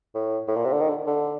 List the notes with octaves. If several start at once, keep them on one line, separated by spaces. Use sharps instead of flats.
A2
A2
A#2
C3
D3
D#3
D3
D3